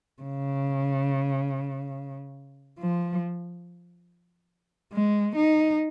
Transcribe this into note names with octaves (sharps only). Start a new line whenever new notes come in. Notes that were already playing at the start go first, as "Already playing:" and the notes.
C#3
F3
G#3
D#4